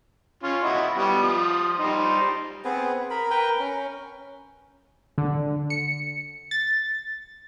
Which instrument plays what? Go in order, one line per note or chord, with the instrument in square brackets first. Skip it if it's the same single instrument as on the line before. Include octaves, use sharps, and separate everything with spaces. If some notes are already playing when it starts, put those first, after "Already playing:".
[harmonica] C#4 F4
E4 F#4 D#5
G3 B3
F3 D#6
G3 D#4 C5
[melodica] B3 C4 G#4 B4
A#4 B5
A#4 B4 G5
C#4
[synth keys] D3
C#7
A6